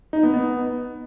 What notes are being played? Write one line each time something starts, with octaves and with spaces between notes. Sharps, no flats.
D#4
B3
B3